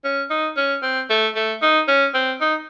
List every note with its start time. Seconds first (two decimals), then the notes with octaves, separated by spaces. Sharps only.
0.04 C#4
0.30 D#4
0.57 C#4
0.83 C4
1.10 A3
1.36 A3
1.62 D#4
1.88 C#4
2.14 C4
2.41 D#4